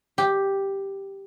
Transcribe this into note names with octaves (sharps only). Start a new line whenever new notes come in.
G4